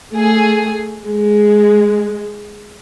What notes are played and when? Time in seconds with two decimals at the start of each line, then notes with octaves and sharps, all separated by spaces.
0.13 A3 G#4
1.06 G#3